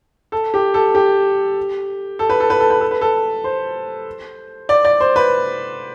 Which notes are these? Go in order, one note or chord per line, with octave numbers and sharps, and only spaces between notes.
A4
G4
A4
G4
A4
B4
A4
B4
A4
B4
A4
B4
A4
C5
D5
D5
C5
B4